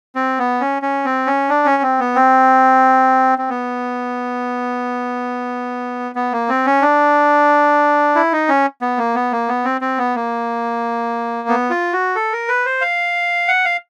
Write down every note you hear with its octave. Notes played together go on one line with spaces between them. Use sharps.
C4
B3
C#4
C#4
C4
C#4
D4
C#4
C4
B3
C4
C4
B3
B3
A#3
C4
C#4
D4
E4
D#4
C#4
B3
A#3
B3
A#3
B3
C4
C4
B3
A#3
B3
F4
F#4
A4
A#4
B4
C5
F5
F#5
F5